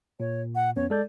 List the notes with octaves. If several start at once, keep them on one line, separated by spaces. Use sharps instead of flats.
A#2 C#5
F#5
F2 B3 C#4 C#5
G#3 A4 D5 G6